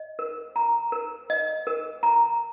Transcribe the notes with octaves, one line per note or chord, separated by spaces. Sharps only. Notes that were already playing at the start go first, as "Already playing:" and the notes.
Already playing: D#5
A#4
A#5
A#4
D#5
A#4
A#5